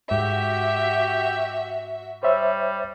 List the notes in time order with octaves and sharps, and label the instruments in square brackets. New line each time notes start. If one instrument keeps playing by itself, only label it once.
[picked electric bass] G#2 [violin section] F#4 E5 [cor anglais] G4
[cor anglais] G3 [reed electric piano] C5 C#5 E5